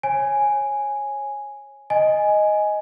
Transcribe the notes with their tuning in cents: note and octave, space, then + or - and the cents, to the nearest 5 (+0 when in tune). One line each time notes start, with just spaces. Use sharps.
C#5 -20 G#5 +0
D#5 +0 G#5 +5